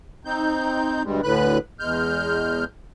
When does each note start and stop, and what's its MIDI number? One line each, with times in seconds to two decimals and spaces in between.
0.25 1.03 60
0.25 1.03 63
0.25 1.03 91
1.04 1.21 38
1.04 1.21 43
1.04 1.21 55
1.04 1.21 56
1.23 1.58 38
1.23 1.58 45
1.23 1.58 50
1.23 1.58 71
1.23 1.58 83
1.23 1.58 90
1.80 2.64 40
1.80 2.64 56
1.80 2.64 89
1.80 2.64 91